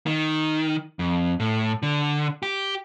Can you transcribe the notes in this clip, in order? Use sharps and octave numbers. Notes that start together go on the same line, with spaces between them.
D#3
F2
A2
D3
G4